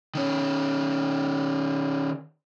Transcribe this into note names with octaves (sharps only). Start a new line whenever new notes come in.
D#3 C#4